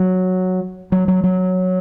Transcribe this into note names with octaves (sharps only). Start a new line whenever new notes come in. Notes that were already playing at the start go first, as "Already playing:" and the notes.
Already playing: F#3
F#3
F#3
F#3